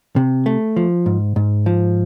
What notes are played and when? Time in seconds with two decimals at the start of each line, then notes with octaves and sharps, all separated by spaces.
0.16 C3
0.46 A3
0.76 F3
1.06 G#2
1.36 G#2
1.66 F3